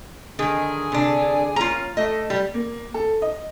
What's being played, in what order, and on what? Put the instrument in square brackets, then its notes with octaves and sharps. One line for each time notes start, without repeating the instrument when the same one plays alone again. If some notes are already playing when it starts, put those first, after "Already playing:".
[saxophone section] D3 G#4 [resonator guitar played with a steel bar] D#3
[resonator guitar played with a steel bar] C3 D4
[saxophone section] A#3 C#4 [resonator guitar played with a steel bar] F4 A#5
[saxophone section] A3 [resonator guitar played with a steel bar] D#5
[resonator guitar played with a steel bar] G3
[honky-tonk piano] A#3
A4
D#5